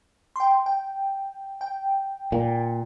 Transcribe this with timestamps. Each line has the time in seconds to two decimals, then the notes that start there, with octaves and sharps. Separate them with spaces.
0.36 G5 C6
0.66 G5
1.61 G5
2.32 A#2